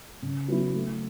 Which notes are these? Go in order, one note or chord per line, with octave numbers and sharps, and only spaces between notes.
C#3
F#3 B3 E4
A3